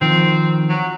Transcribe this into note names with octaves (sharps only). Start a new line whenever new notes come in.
D#3 F3 C4
F#3